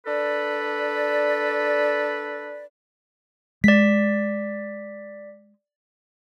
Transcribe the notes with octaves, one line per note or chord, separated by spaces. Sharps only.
D4 A4 B4 D5
G#3 D5 B6